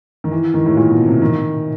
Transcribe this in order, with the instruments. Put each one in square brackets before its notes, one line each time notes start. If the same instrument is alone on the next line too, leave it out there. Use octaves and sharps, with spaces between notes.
[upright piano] D#3
E3
D#3
A2
A#2
B2
C3
D#3